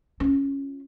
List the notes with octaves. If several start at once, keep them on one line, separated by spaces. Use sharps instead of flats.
C#4 F4